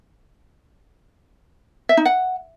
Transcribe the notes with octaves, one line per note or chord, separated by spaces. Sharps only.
E5
D#4
F#5